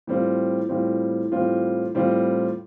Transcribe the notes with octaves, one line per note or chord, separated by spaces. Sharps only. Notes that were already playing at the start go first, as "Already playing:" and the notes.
A2 E3 G3 C4 F4
A2 E3 G3 C4 F4
A2 E3 G3 C4 F4
A2 E3 G3 C4 F4